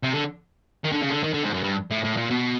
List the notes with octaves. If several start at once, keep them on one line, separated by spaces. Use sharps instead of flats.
C3
D3
D#3
D3
C#3
D3
D#3
D3
G#2
F#2
G2
A2
A2
A#2
B2